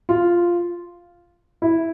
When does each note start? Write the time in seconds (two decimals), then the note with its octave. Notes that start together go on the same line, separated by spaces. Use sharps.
0.09 F4
1.62 E4